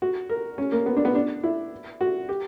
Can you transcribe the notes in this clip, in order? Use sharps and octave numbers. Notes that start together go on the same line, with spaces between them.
F#4
A#4
C#4
A#3
B3
D4
B3
D4
E4
F#4
G4